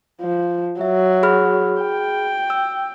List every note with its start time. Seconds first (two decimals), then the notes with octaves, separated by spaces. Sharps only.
0.21 F3
0.81 F#3 E5
1.23 G#4 B5 F6
1.81 G5
2.50 E6